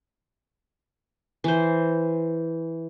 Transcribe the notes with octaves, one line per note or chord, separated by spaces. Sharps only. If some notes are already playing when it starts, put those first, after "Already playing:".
E3 C5